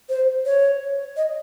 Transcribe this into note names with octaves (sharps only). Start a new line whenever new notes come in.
C5
C#5
D#5